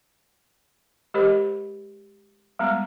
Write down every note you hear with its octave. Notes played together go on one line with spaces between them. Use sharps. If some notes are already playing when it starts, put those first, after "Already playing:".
G#3 G4 A#4 C5 D#5 B5
G3 G#3 B3 A#5